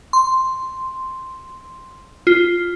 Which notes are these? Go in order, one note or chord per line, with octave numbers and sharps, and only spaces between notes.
C6
F4